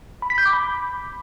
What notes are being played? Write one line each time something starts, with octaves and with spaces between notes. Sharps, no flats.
B5
B6
G6
D6
B5